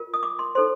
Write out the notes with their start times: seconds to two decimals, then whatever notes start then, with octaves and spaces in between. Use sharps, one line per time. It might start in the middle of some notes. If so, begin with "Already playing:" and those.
Already playing: F4 A#4
0.14 D#6
0.23 D6
0.39 C6
0.55 D#4 A4 C5 C6